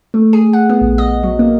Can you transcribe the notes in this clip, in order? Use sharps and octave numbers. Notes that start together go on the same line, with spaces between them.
A3
G#4
F#5
B3
A#1
D#5
F#3
A#3